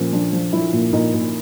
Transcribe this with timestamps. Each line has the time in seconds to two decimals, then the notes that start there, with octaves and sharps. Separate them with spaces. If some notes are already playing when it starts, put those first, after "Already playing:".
Already playing: A#2 F3 C#4
0.13 F3 D4
0.33 F3
0.53 F3 E4
0.73 A#2
0.93 A#2 D#4
1.14 A#2